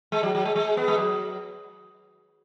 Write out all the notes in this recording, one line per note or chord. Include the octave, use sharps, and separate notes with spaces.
G#3
F#3
F#3
G#3
G#3
B3
G#3
F#3